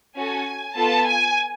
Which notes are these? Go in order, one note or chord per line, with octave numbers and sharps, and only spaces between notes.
C#4 F#4 A4 G#5
B3 F4 A4 A5
G#5